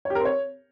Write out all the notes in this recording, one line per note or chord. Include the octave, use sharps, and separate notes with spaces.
C#5
G4
A#4
C4
C#5